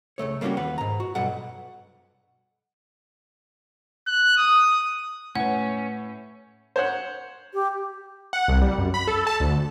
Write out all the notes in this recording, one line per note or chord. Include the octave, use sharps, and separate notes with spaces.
C#2 G#2 A3 C#5
G3 A#3 B3 C#4 F#4 G4
D#2 B4 F#5
G#2 A#5
F#4
B1 G2 G3 B4 F#5
F#6
D#6
A2 C#4 B4 F#5
C5 C#5 F#5
G4
F#5
C2
G3
F#2
B5
A4
A5
D2